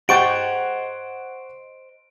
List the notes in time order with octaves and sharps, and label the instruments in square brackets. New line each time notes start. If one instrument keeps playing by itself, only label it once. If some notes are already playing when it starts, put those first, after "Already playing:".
[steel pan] G4 G5 [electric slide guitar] C5 D#5 [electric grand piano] F#5 C#6 A6 [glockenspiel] D7